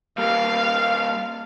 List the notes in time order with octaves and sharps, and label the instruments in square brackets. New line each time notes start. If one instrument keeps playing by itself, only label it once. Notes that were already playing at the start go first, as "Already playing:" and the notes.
[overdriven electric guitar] G3 A#3 [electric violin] F5